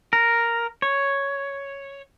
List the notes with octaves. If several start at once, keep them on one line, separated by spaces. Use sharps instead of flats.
A#4
C#5